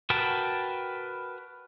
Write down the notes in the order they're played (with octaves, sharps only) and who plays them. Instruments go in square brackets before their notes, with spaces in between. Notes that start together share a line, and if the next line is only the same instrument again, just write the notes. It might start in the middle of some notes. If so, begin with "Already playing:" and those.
[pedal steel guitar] F#4 A#4 B4 G5 A5